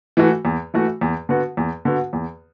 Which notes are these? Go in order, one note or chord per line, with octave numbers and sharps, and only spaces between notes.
E3 A3 F#4
E2
E3 A3 F#4
E2
D3 B3 F#4
E2
D3 B3 F#4
E2